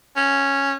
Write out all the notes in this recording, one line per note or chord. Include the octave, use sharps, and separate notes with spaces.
C#4